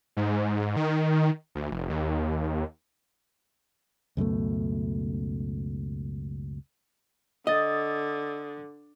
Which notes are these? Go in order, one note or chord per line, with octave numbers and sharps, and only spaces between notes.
G#2
D#3
D2
F1
D#2
C#2 F#2 B2 A3
D3 D#5 D#6 A6